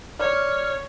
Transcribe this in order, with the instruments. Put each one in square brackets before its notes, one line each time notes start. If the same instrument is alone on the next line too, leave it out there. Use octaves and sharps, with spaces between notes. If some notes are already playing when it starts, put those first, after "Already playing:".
[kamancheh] C#5 [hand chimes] D5 [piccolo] F6